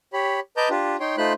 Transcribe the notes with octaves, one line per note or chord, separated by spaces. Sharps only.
G4 C#5 B5
B4 D#5 A5 A#5 D6 G6
D4 F4 G4
D#4 C#5 G5 C6
A3 D#4 F4 C5 B5 F#6